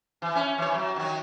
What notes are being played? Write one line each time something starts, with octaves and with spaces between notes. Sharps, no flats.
E3
C#4
E3 C#5
F#3
D#3 F#3